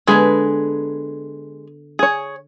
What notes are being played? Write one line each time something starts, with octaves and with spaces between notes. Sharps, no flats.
D3 G#3 B3 G#4 B4
G#4 C#5